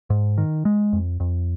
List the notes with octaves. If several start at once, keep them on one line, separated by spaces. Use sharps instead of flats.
G#2
D#3
G#3
F2
F2